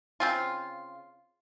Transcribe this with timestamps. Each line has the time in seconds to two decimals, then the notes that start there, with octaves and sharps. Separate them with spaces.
0.20 C#3 C4 F4